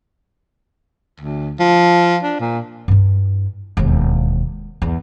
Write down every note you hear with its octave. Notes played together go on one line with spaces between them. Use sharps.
D2
F3
D4
A#2
G2 E4
E1 D#2
E2